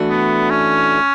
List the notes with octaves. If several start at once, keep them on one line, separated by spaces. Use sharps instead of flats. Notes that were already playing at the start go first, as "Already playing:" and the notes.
Already playing: E3 A3 D4 F#4
B3
C#4